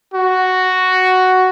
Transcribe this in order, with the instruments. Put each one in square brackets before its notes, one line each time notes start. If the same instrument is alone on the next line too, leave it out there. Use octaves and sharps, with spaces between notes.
[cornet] F#4